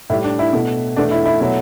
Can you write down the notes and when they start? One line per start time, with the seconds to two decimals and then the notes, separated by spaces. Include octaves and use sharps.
0.10 A2 E4
0.14 G3
0.24 D4
0.39 E4
0.53 B2 A3
0.97 E2 B2 A3 D4
1.11 E4
1.26 E4
1.40 B2 F#3 A3 E4